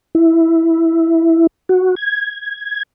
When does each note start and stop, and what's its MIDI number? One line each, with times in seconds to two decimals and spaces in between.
0.15 1.47 64
1.69 1.95 66
1.96 2.83 92